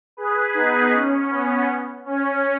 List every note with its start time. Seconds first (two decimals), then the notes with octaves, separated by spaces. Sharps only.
0.17 G#4 B4
0.54 B3 D#4
0.92 C#4
1.31 B3
2.06 C#4